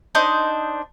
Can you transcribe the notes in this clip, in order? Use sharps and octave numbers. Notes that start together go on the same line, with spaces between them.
D4 D#4 C5